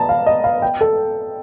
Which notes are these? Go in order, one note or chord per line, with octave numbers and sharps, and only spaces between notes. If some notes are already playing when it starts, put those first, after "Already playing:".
Already playing: A5 A#5
F5
D#5
F5
G5
A4